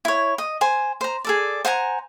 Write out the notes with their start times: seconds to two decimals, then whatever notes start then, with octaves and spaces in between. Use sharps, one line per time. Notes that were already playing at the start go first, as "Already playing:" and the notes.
0.05 E4 C#5
0.38 D#5
0.61 C5 G#5
1.01 C5 A#5
1.25 G#4 A4 D5
1.65 C5 F#5 G#5 A#5